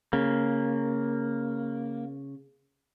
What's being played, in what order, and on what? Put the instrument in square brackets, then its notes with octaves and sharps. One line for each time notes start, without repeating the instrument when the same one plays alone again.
[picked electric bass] C#3 [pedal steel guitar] A#3